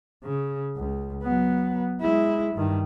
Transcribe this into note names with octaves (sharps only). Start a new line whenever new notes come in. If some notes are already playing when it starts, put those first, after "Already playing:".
C#3
C#2
F#3 B3
G#3 E4
G2 D#3